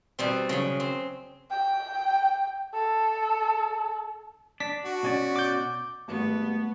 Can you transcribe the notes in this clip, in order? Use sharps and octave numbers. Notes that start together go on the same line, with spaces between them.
B2 G3 C4
C#3 F#3
C4
G5
A4
D4 B6
F#4
B2 C#4 D5
D6 G6
G#1 G3 A3 B3 C#6